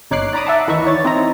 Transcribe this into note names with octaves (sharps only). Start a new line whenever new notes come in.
G1 D#4 C#5 D6 F#6 C7
D5 A#5 B5 D6 D#6
E5 F#5 A5
D#2 E3 D#4 E5 B5 C#6
C#5 D5 A6
C4 D#4 E4 D#5 A#5